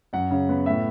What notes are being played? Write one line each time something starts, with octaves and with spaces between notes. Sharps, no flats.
F#2 F#5
C#3
B3
A2 E5